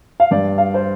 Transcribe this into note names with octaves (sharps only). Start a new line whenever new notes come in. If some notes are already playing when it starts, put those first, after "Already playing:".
F5
G2 D5
F5
C5